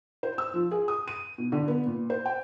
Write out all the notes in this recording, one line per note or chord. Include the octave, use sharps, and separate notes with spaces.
C5
E6
F3
G#4
D#6
D#7
B2
D3
B3
A#2
C5
G5